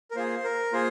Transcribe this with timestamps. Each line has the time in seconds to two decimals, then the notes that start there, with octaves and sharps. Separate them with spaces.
0.11 A#4
0.15 A#3 F4 G#4 C5
0.44 A#4
0.73 A#3 F4 G#4 C5